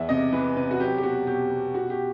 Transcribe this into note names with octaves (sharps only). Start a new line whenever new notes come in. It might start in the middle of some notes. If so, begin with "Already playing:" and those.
Already playing: E2 E5
C3 D#5
E3 B4
C3 B4
F#4
F#3 G4
G4
B2 F#4
B2 G4
B2
B2 F#4
G4